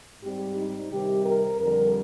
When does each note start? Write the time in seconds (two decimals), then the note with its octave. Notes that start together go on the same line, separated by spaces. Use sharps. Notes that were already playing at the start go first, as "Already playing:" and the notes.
0.23 G#2 G3 C4 G4
0.56 D#4
0.91 C3 D#3 G3 C4 G4
1.26 A#4
1.60 F2 D3 G3 A#4